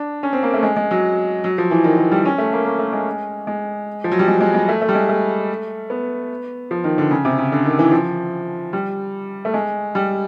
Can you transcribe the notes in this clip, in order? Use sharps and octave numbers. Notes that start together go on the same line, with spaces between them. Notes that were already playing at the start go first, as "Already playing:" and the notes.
Already playing: D4
C#4
C4
A#3
A3
G#3
G#3
F#3
F#3
F3
E3
D#3
D#3
G3
C#4
A3
A#3
A#3
A3
G#3
G#3
F3
F#3
G3
G#3
G#3
G#3
A3
A3
G3
G#3
A3
B3
F3
D#3
D3
C#3
C3
C#3
D3
D#3
E3
F3
G3
A3
G#3
G3